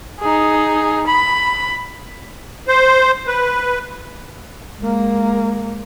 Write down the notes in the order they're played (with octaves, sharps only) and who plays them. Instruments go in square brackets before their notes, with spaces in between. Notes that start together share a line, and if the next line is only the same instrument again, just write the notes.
[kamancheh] D#4 G#4
B5
[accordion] C5
B4
[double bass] G#3 A#3